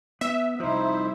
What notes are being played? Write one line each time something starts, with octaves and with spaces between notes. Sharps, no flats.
B3 E5
C2 F3 D#4 E4 C5